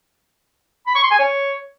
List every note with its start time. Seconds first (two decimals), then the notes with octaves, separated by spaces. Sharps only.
0.87 B5
0.95 C#6
1.03 C6
1.11 G#5
1.19 C#5